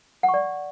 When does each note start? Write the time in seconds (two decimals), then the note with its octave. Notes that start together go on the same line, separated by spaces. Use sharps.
0.23 F#5
0.29 C#6
0.34 D5